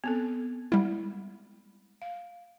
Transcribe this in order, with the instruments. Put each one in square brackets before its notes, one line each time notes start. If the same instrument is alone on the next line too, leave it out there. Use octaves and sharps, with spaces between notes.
[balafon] B3 C4 A4
[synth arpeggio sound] G3 E4 [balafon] G#3
[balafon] F5